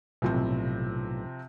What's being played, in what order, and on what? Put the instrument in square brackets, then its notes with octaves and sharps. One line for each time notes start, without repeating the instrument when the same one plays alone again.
[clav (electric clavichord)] B1 A2 [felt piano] C3 F3 C4